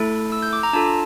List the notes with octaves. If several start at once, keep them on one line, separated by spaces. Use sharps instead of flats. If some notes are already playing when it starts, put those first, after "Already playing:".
Already playing: A3 E4 A4
E6
G6
D6
A#5
D4 F4 A4 A5